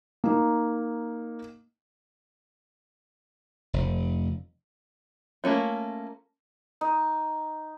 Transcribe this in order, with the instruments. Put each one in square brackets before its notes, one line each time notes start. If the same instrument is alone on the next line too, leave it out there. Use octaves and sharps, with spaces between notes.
[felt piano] A#3 D#4
[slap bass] F1
[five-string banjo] A3 A#3 C#4 F4
[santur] D#4